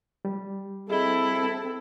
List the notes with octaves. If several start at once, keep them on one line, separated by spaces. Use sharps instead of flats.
G3
C4 E4 G#4 A4 D#5 G7